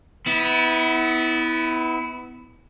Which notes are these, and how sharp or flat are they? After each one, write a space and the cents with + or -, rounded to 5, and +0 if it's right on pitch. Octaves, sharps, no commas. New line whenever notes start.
B3 +15 E4 -25